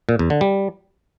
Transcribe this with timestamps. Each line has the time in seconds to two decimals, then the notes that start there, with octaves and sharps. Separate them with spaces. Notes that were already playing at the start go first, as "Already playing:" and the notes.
0.09 A#2
0.19 E2
0.30 D3
0.41 G3